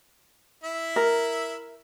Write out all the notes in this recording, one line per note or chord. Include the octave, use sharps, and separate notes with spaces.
E4 E5
A#4